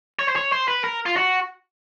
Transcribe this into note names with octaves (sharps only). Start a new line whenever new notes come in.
C#5
C5
C#5
C5
B4
A#4
F4
F#4